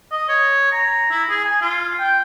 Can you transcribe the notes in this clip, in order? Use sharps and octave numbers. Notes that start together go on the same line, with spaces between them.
D#5
C#5
A#5
E4
G#4
G#5
F4
G5